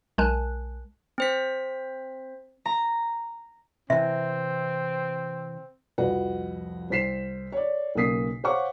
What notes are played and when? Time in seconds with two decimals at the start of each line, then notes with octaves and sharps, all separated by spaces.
0.18 B1 G#3 A#4 G#5 A5 F#6
1.18 C4 C5 B6
2.66 A#5
3.90 C3 E3 C4 E5
5.98 C2 F2 F3 F#4 B4 F#5
6.90 C2 C5 B6 C7 E7
7.52 C#5 D5
7.95 B1 C#3 A#3 D#6 B6 C7
8.44 C5 C#5 F5 F#5 C#6 D6